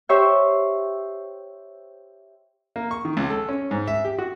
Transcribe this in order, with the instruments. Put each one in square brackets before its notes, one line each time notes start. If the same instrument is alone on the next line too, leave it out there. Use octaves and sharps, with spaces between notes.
[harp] G4 C5 C#5 E5 G5
[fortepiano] A#3
C#6
D#3
C#2
A4
C#4
G#2
E5
G4
F#4